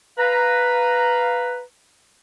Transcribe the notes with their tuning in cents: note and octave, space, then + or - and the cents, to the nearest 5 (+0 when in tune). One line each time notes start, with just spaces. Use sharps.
B4 +0 F5 +0 A#5 +0